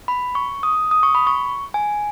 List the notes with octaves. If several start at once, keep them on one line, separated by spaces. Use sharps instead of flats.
B5
C#6
D#6
D#6
C#6
B5
C#6
G#5